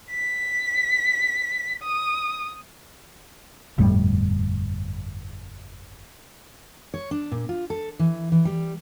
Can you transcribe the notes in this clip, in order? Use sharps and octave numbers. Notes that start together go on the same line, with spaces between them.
B6
D#6
G1 F2 A2 G3
C#5
D4
A#2
F4
A4
E3
E3
G3